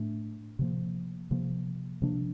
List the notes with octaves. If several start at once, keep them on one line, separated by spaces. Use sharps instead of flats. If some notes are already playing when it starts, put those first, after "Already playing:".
Already playing: A2 A3 D4
C3 F3 A#3
C3 F3 A#3
C3 F3 A#3 D4